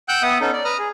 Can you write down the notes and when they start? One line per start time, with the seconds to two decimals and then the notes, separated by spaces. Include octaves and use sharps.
0.09 F#5 G5 E6 F#6 G6
0.22 B3 E5 F#5 D#6
0.41 B3 C#4 D#4 A4
0.53 D5
0.65 B4 A#5 D#6 F6
0.79 G#4